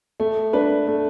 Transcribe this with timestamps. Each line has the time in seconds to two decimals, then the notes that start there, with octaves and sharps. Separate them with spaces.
0.20 A3
0.53 D4 B4
0.87 A3